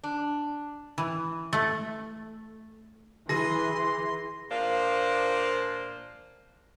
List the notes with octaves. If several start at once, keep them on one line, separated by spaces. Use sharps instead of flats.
D4
E3
A3
E3 G#4 C6 A#6
A#2 F3 A#3 D4 C5 F5